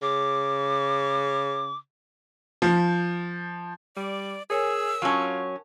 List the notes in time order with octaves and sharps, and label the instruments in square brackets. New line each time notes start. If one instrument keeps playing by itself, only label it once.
[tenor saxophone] C#3 [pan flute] D6
[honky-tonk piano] F3
[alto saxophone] G3 [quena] D5
[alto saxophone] G#4 [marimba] A#4 C#5 G#5 [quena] E6
[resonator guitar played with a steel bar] F#3 C#4 [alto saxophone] F4 [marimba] A5 C#6